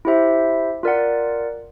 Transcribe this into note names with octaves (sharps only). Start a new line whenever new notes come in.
E4 G4 C5 E5
F4 A#4 D5 F#5